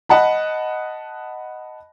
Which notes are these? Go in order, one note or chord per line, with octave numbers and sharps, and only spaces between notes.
D#5 F#5 A5 B5